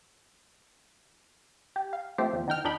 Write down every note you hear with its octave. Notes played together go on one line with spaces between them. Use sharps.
G4
F5
F3 A3 C4 G4 A4 C5
E2 F3
D#3 D#4 G5 F6
F2 D4 D#4 G5 B5